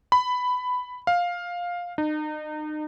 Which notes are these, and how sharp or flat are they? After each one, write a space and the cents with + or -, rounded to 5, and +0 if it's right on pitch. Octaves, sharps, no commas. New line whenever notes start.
B5 +10
F5 +10
D#4 -35